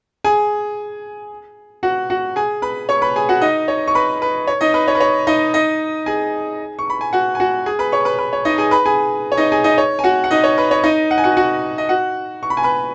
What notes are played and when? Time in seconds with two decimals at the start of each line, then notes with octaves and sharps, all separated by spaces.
0.24 G#4 G#5
1.83 F#4 F#5
2.10 F#4 F#5
2.36 G#4 G#5
2.62 B4 B5
2.89 C#5 C#6
3.02 B4 B5
3.16 G#4 G#5
3.29 F#4 F#5
3.42 D#4 D#5
3.68 C#5
3.88 C#6
3.95 B4 B5
4.22 B4
4.47 C#5
4.61 D#4 D#5
4.74 B4
4.88 C#5
4.95 B4
5.00 C#5
5.27 D#4 D#5
5.54 D#4 D#5
6.06 G#4 G#5
6.79 C#6
6.90 B5
7.01 G#5
7.13 F#4 F#5
7.35 G#5
7.40 F#4 F#5
7.66 G#4 G#5
7.79 B4 B5
7.92 C#5 C#6
8.05 B4 B5
8.19 B4
8.33 C#5
8.45 D#4 D#5
8.58 G#4 G#5
8.71 B4 B5
8.86 G#4 G#5
9.32 C#5
9.37 D#4 D#5
9.52 G#4 G#5
9.64 D#4 D#5
9.78 C#5
9.99 G#5
10.04 F#4 F#5
10.24 F#5
10.31 D#4 D#5
10.44 C#5
10.58 B4
10.71 C#5
10.83 D#4 D#5
11.11 F#5
11.18 G#5
11.24 F#4 F#5
11.37 F#4 F#5
11.78 D#5
11.89 F#4 F#5
12.43 C#6
12.50 B5
12.57 G#5
12.63 B4 B5